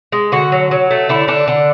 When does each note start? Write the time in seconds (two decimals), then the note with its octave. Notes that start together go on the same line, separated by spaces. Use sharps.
0.12 G#3
0.32 D3 F#4
0.52 F#3
0.71 F#3
0.91 A3
1.09 D3 E4
1.28 D3 D4
1.48 D3